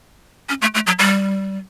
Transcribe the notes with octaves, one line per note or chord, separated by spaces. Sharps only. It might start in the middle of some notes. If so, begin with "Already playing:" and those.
C#4
A3
A3
F#3
G3